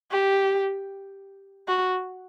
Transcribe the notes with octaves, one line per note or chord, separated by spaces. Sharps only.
G4
F#4